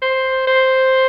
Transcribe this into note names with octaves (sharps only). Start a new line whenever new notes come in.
C5
C5